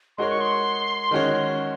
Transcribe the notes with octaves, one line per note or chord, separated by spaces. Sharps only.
G#3 D#4 F#4 A#4 C#5 C6
C#6
C6
D#3 G#3 C#4 F#4 C#5